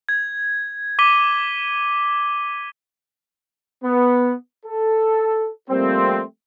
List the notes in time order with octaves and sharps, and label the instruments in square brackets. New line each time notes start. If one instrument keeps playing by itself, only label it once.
[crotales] G#6
D6 B6 D#7 G7
[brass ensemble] B3
A4
F3 G3 A3 A#3 C4